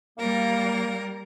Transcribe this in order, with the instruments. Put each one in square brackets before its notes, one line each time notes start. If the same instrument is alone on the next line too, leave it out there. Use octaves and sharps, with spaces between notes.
[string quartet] G3 A#4 [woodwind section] A#3